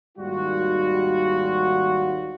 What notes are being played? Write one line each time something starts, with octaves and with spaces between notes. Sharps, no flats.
G#1 D#2 G3 F4 F#4